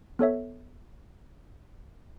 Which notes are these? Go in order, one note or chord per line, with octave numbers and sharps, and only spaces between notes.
B3 A4 C#5 E5